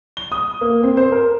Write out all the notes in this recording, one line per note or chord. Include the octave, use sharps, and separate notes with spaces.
G7
D#6
A#3
C4
C5
A#4